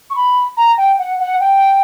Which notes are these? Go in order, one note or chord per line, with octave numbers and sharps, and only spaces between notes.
C#6
B5
A#5
G5
F#5
F#5
G5